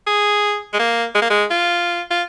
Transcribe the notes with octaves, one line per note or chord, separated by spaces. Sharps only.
G#4
G#3
A#3
G#3
A#3
G#3
F4
F4